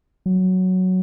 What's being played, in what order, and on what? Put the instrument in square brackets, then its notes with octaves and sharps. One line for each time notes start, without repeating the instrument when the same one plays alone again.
[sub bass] F#3